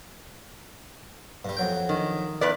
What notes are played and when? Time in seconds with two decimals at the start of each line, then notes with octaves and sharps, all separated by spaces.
1.45 G2 G3
1.57 F2 F#3 G5
1.89 D#3
2.41 E2 B4 D5